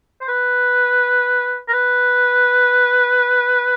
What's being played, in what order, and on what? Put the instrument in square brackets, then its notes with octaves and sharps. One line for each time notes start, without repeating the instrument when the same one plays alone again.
[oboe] C5
B4
A#4
B4